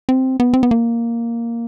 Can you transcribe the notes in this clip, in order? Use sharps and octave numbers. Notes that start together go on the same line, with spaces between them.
C4
B3
C4
B3
A#3